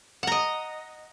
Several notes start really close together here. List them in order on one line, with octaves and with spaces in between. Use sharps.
F#5 A#5 D#5